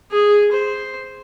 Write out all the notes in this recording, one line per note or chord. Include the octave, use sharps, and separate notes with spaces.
G#4
C5